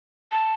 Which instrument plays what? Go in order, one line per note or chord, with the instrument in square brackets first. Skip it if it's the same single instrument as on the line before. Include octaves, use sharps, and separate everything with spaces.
[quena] A5